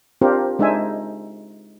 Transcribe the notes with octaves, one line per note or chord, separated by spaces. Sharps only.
C4 D4 F4 G4 A#4 C5
G#3 D4 D#4 C5 E5 G#5